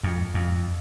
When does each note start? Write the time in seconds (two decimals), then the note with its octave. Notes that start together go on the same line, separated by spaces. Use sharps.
0.03 F2
0.34 F2